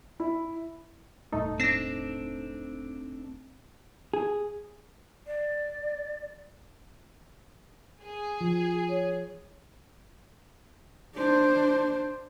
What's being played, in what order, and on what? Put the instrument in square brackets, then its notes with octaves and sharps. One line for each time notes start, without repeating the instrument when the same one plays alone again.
[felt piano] E4
[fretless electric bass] E1 A2 G3 [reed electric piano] A3 D#4 A4
[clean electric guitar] C4 D4 [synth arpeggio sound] A#6 C7
[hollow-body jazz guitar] G#4
[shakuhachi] D5
[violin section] G#4
[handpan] F3
[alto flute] C#5
[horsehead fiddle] D4 C5